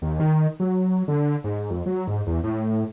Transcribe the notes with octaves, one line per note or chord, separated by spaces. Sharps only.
D#2
D#3
F#3
D3
G#2
F2
F#3
G#2
E2
A2